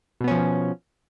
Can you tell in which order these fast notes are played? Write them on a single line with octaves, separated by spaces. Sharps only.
B2 B3 C#4 F3